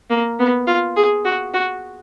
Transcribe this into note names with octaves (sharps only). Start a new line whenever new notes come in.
A#3
B3
F4
G#4
F#4
F#4